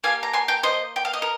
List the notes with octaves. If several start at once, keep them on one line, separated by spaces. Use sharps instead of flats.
A#3 D#4 G4 F5 G#5
A#5
G#5 C6
G5 A#5
C5 D#5
G5
F5
D#5
A#4